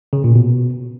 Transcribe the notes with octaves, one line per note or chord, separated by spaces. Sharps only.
C#3
A#2
B2